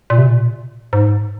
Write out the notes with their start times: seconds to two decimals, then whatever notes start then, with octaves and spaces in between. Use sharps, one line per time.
0.10 A#2
0.18 C3
0.27 A#2
0.93 G#2